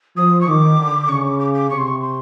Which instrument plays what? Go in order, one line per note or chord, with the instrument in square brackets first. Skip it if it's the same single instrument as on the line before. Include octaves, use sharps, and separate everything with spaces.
[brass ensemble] F3 [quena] D#6
[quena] C#6
[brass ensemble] D#3 [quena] D6
[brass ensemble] D3
[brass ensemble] C#3 [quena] C#6
[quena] D6
D6
D6
[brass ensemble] C3 [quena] C#6
[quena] C6
C#6
C6